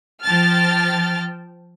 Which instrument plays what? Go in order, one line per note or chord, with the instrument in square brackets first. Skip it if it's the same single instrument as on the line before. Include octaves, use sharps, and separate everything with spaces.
[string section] F3 G5 A5 F6 A6